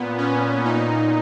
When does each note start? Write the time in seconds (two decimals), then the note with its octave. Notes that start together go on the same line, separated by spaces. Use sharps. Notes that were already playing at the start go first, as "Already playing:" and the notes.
Already playing: A#2 B3
0.17 C#4
0.64 A#2 D#4